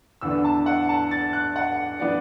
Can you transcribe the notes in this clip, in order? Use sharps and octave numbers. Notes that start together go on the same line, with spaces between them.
E2 D3 B3 D4 E6
A5
F#5
A5
A6
F#6
F#5
E3 B3 D4 D5